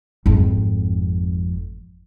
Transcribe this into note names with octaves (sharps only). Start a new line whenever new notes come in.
G#1 F2